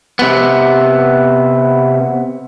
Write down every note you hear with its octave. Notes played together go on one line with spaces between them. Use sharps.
C3 B3